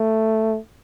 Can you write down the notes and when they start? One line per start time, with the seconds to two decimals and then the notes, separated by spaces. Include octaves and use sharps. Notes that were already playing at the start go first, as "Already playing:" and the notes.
Already playing: A3